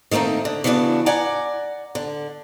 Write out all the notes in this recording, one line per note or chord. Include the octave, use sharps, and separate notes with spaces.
D#3 A3 A#3 C4 D#4
D3
C#3 E3 G3 B3 D4 F#4
D5 F#5 G#5 A#5
D3